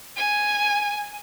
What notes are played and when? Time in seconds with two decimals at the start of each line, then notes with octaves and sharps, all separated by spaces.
0.17 G#5